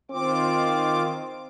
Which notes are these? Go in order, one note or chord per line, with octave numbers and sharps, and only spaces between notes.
D#3 C4 F4 D6